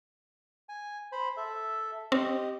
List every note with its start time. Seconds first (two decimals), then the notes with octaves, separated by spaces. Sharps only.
0.69 G#5
1.12 C5 B5
1.37 A4 E5
2.12 C4 G4 D#5